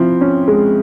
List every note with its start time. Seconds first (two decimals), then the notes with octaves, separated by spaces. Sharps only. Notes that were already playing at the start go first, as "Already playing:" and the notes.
Already playing: F3 C4 E4
0.21 C#4
0.48 G#3